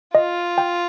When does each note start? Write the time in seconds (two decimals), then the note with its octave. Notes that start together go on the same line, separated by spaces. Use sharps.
0.15 F4 D#5
0.58 G5